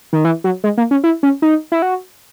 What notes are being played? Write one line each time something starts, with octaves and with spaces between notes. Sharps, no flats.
D#3
E3
F#3
G#3
A#3
C#4
E4
C#4
D#4
E4
F#4